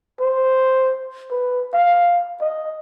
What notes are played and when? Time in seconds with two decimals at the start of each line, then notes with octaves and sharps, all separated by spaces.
0.20 C5
1.31 B4
1.74 F5
2.41 D#5